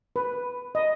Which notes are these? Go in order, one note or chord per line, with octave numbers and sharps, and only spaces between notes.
B4
D#5